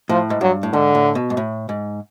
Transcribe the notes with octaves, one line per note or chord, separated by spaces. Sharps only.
A2 F3
G#2
G2 F#3
A2
G#2 D3
A2
B2
G#2
A2
G#2